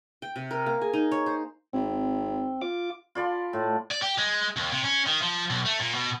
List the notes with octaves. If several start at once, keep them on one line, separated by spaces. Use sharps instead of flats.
G5
C3
A#4
A#3
G#4
D#4
C#5
C5
G#1 C4
F4 D6
F4 D5 B5 C6
A2
D5
G4
G#3
D#2
C3
C#4
D#3
F3
B1
A3
A#2
B2